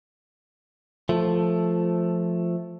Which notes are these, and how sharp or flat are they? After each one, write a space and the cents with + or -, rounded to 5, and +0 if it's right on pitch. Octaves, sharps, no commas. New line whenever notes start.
F3 +0 A3 +0